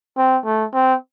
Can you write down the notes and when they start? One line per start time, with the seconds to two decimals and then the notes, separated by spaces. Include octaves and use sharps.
0.17 C4
0.45 A3
0.74 C4